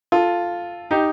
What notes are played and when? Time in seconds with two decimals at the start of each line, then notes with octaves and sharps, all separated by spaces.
0.12 F4 A4
0.91 D#4 G4